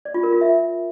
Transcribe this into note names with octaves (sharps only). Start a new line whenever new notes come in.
D5
F4
A#4
F4
E5